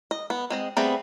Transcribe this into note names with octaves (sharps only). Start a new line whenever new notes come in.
D#5
B3
G#3 C4 D#5
G3 A3 B3 C4 G#4